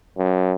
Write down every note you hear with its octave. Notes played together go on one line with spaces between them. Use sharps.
F#2